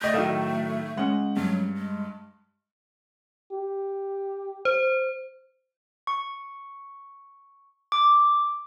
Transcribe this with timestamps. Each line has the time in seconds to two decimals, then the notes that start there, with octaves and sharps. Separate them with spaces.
0.02 A3 D5 D#5 G6
0.14 A2 D#3 F#3 A4 F5
0.97 G#3 C#4 F#5
1.37 G2 F#3
1.77 G#3
3.52 G4
4.65 C5
6.07 C#6
7.92 D6